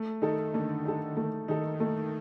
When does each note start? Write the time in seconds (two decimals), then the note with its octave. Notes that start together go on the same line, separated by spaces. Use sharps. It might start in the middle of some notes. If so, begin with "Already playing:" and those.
Already playing: A3
0.22 D#3 D#4 A4
0.54 D3 A3
0.85 D3 D#4 A4
1.16 D#3 A3
1.48 D#3 D#4 A4
1.80 A3